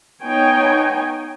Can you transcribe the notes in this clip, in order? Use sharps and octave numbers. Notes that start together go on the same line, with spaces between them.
B3 D#4 C#5 G5 G#5